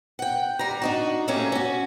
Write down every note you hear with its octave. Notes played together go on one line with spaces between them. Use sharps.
F#5 G5
G3 A#5
D4 D#4 F#4
G3 A3 A#3 C#4
C#4 F#4